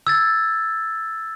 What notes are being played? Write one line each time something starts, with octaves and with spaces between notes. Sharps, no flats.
E6 G#6 A6